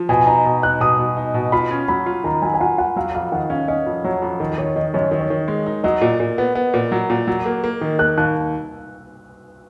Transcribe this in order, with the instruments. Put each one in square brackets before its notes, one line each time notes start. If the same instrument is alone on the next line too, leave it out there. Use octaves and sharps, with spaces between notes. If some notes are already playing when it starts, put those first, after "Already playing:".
Already playing: [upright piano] F3
[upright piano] B2 [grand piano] G#5
[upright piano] D#4 [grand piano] A#5
[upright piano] B2
[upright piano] D#4 [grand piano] F#6
[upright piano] B2 [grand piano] D#6
[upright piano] B2
D#4
B2
[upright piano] F4 [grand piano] B5
[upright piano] C#4
[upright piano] F#3 [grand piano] B5
[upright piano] F4
[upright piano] D#3 [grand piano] A#5
[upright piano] F#3 [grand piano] G#5
[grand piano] G#5
[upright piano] F4 [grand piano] F#5
[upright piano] F4 [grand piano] F#5
[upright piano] F#3 [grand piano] F5
[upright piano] F2 [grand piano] F5
[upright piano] D#3 [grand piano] F#5
[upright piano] C#4 [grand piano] F5
[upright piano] C#4 [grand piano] D#5
[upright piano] F2
[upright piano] F#3 [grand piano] C#5
[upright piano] F2
D#3
[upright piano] D#3 [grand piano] C#5
[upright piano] D#3 [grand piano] D#5
[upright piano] F#2 [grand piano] C#5
[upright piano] D#3
[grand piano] C#5
[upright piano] D#3
G#3
D#4
[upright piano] F#3 [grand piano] D#5
[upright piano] A#2
A#2
B3
B3
A#2
F#3
A#2
F#3
A#3
A#3
D#3
[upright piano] A#3 [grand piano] F#6
[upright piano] D#2 [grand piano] F#6